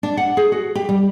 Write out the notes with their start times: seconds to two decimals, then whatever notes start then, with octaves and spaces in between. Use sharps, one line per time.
0.03 D4
0.17 F#5
0.37 G#4
0.52 F#4
0.75 G4
0.89 G3